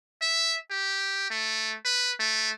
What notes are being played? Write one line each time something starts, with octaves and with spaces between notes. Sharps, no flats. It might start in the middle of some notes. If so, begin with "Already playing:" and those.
E5
G4
A3
B4
A3